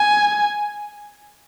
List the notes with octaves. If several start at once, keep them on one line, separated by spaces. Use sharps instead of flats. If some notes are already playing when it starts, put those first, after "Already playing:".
Already playing: G#5